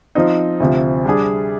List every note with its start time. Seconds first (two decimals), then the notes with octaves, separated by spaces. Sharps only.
0.15 F3 C4 D#4
0.60 D2 C3 F3
1.05 G3 D4 G#4